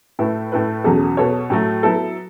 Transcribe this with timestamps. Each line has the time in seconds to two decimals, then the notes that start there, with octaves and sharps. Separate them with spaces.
0.19 A2 A3 E4 B4
0.52 A2 A3 E4 B4
0.84 E2 B2 F#3 C#4 A4
1.17 B2 B3 A4 C#5
1.50 A2 F#3 A3
1.83 F#3 B3 E4 A4